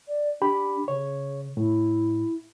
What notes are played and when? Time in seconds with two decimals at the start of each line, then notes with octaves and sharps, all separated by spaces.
0.08 D5
0.42 D4 G4 B5
0.88 C#3 C#5
1.57 A2 E4